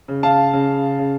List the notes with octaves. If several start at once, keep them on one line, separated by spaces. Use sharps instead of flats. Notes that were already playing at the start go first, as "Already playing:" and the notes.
C#3
F5 A5
C#3
C#3